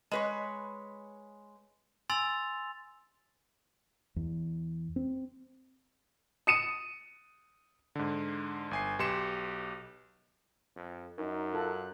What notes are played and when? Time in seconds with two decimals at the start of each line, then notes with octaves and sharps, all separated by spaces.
0.11 G#3 B4 C#5
2.10 G#5 C6 E6 A6 F7
4.16 E2
4.96 C4
6.47 D#6 C#7 D#7
7.95 G#2 D3
8.71 G1 G#5 C7
8.99 B1 G4 B4 C6 C#7 E7
10.77 F2
11.18 F#2 D#4 A#4
11.53 F4 A4 F#6